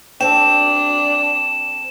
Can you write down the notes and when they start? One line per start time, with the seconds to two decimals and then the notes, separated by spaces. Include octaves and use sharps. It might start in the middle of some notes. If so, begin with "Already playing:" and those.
0.21 C4 D4 A4 G5 E7